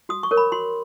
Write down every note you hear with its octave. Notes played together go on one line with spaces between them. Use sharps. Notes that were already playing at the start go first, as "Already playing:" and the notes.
F#4 D#6
C#6
A#4 C#5
B5
F#4 C6